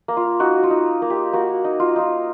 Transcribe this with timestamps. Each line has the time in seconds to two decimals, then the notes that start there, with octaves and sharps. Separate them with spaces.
0.08 A#3
0.17 F4
0.40 D#4 F#4
0.63 F4
0.70 D#4
1.02 A#3
1.10 G4
1.33 A#3 F#4
1.64 D#4
1.80 F4
1.96 D#4 F4